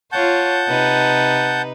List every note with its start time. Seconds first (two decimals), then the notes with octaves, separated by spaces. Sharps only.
0.12 F4 C#5 F#5 A5 G6
0.68 C3 D#4 B4